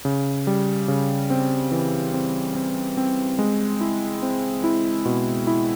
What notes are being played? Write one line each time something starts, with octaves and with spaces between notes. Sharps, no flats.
C#3
G3
C#3
C4
E3
C4
C4
C4
G#3
E4
C4
E4
B2
E4